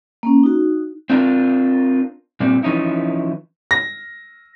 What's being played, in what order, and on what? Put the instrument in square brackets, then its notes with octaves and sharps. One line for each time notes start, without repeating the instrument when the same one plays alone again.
[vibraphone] A#3 C#4
D#4 F#4
[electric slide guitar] C4 D4 F4 A#4
A#2 G3 C4
E3 F3 C#4 D#4 E4
[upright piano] A#6